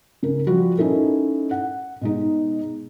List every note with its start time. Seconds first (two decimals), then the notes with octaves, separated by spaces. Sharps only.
0.23 C#3 A#4
0.47 F3 G3 F#4
0.78 C#4 D#4 E4 A4 A#4
1.51 F#5
2.01 B2 G#3 D#4